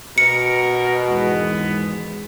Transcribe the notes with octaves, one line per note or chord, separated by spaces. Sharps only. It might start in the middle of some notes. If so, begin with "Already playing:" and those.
B2 A#4 C#7
G#1 E2 G#3 B3